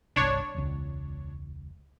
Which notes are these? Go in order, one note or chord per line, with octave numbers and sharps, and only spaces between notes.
G1 C2 D4 C#5
E1 C#2